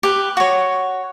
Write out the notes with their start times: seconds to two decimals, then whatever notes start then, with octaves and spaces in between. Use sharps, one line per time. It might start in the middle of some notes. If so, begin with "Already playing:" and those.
0.03 G4 B4
0.37 F#4 C#5